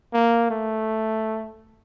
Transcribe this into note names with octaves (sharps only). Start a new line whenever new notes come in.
A#3
A3